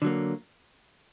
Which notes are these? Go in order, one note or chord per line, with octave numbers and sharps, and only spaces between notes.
D3 F#3 A#3